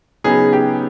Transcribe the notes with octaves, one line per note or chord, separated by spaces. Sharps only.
C#3 F#3 B3 D#4 G#4
G4